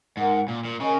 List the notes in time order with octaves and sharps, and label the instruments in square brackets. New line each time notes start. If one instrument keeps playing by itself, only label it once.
[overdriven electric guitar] G#2 [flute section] D#4 A#4 F#5
[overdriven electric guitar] A#2
A#2
[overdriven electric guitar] C#3 [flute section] A#4 D#5 G#5 C#6